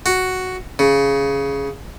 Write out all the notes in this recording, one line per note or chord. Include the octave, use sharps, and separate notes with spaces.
F#4
C#3